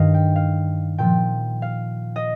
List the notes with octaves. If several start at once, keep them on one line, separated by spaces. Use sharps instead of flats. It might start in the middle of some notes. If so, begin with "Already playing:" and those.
Already playing: G2 D#3 D#5 F5
G5
F5
A#2 F3 G5
F5
D#5